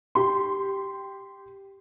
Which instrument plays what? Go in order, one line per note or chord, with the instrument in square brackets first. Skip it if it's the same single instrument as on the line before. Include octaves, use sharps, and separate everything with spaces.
[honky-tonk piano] G4 C6